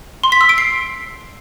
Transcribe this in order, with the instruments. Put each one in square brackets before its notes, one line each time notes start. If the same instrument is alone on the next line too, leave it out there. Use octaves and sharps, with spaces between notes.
[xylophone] C6
B6
E6
D7
C7